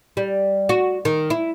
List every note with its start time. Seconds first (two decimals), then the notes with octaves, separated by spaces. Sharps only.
0.17 G3
0.69 F#4
1.05 D#3
1.30 E4